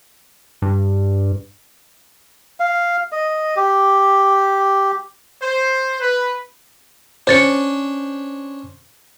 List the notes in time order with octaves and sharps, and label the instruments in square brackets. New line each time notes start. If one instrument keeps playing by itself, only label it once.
[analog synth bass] G2
[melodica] F5
D#5
G4
[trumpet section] C5
B4
[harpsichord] C#4 D4 [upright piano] C5 [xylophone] C#5 A6 C#7